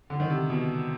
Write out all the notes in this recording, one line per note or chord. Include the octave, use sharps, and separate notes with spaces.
D3
D#3
C3
B2